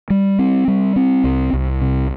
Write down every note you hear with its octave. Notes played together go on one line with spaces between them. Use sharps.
G3
C4
G3
C4
C2
C2
C3